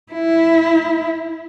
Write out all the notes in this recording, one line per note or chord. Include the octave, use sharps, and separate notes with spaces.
E4